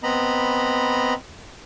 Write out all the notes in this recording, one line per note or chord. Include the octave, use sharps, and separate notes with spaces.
B3 C4 D#5 A#5 B5